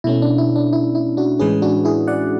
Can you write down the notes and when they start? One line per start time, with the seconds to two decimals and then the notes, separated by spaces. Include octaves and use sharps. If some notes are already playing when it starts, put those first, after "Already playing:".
0.04 B2 A3 C#4 E4
0.22 D4
0.38 E4
0.56 D4
0.73 E4
0.95 E4
1.17 D4 F#4
1.39 A2 E3 G#3 C#4 G#4 B4
1.62 D4 F#4
1.85 E4 G#4
2.07 D5 F#5